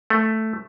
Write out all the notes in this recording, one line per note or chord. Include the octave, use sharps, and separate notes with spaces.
A3